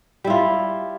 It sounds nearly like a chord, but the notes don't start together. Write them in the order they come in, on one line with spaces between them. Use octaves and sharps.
G3 E4 F4